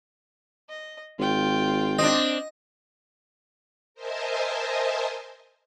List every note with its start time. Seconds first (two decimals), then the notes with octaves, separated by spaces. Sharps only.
0.69 D#5
1.19 G#1 F4 G5
1.99 C4 D4 D#5
3.94 A#4 C5 D#5 E5 G#5 A5